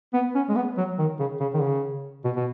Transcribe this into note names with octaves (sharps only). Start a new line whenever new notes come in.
B3
C#4
G#3
B3
F#3
D#3
C#3
C#3
D#3
C#3
B2
B2